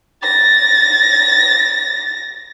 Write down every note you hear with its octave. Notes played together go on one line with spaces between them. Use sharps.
A6 A#6